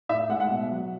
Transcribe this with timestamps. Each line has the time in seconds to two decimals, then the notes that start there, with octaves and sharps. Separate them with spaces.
0.09 A2 E5
0.29 G#3 F#5
0.40 F#5
0.50 B2
0.70 F#3